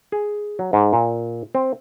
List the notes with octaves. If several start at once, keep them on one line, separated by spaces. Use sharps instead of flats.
G#4
F#3
G#2
A#2
C4